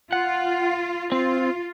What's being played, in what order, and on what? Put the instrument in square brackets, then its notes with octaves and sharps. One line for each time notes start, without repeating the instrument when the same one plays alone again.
[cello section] F4 [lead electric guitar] F#5
[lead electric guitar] C4 [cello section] F4